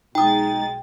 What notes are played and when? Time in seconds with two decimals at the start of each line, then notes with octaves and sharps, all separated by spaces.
0.15 B1 G#3 D#4 G5 D#6 A6